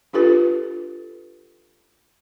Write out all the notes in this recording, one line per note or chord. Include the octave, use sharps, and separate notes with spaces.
D4 F4 G4 A4 B4